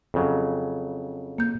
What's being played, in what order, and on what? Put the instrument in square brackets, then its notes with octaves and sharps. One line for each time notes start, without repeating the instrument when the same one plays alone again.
[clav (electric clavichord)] F2 C#3 F#3
[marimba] A#3 G6